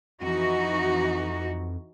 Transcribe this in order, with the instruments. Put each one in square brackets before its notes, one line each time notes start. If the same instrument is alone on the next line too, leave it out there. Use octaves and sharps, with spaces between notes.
[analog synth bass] F2 [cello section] E3 D#4 F#4